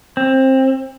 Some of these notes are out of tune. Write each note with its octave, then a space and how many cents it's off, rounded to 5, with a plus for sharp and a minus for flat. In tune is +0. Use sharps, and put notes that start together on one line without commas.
C4 +20